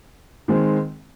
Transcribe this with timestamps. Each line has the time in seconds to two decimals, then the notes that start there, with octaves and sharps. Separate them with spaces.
0.48 D#3 G#3 C4